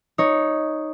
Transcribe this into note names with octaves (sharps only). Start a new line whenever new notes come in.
D#4 C#5